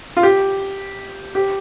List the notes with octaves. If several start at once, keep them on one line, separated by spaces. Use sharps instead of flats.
F4
G4
G4